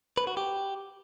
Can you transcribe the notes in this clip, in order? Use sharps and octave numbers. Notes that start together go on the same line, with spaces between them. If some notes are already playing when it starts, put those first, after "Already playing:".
B4
F#4
G4